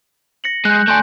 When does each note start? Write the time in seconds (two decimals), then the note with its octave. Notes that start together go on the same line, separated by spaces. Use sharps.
0.44 A#6 C#7 F#7
0.65 G#3 F#6 G6
0.88 A3 D5 G#5 C6 G6